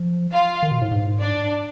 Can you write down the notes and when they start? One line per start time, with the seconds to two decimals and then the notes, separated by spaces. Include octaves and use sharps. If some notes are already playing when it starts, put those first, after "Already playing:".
Already playing: F3
0.32 F4 F5
0.63 D#3
0.71 B2
0.81 A2
0.91 G#2
1.21 D4 D5